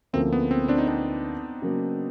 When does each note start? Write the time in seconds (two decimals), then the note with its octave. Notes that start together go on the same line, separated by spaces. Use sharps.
0.13 D2 D3 F3 A#3 C4 C#4
0.33 B3
0.51 C4
0.68 C4 D4
0.78 D#4
0.88 C4 D4
1.62 C#3 F#3 A#3